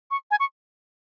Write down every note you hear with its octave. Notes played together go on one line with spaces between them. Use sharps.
C#6
G#5
C#6